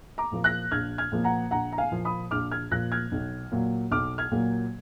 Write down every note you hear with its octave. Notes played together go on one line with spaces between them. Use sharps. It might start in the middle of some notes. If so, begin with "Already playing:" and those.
A#5 D6
A#2 F3 A#3
F#6 A#6
A#1 F6 G#6
F6 G#6
A#2 F3 A#3
F#5 A#5
A#1 F#5 A#5
A#5
F5 G#5
A#2 F3 A#3
B5 D#6
A#1 D6 F6
F6 G#6
A#2 F3 A#3 F#6 A#6
F6 G#6
B1
A#2 F#3 A#3
B1 D6 F6
F6 G#6
A#2 F#3 A#3